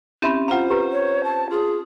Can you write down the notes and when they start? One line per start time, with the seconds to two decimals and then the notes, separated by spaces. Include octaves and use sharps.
0.22 C4 C#4 E4 G4 E5 B5
0.48 F4 C5 F5 F#5 A#5
0.70 G4 B4 A#5
0.92 C#5
1.24 A5
1.50 F4 G#4